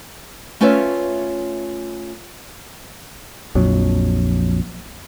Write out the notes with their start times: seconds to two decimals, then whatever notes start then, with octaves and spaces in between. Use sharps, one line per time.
0.61 A3 C#4 F4 B4 C#5 E5
3.55 A#1 F2 F#3